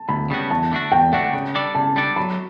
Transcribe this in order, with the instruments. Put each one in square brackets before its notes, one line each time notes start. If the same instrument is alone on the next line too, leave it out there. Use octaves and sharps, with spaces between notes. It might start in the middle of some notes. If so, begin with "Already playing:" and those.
Already playing: [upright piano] A5
[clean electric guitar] D2 [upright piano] B5
[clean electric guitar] C#3 G3 B3 F#4
[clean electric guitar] E2 [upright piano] A5
[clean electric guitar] D3 A3 D4 F#4
[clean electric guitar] E2 [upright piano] G5
[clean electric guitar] D3 A3 D4 F#4 [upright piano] F#5
[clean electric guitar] C#3
G3 D4 A4 D5
[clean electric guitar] C#3 [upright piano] A5
[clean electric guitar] G3 D4 A4 D5
[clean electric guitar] F#3 [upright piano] B5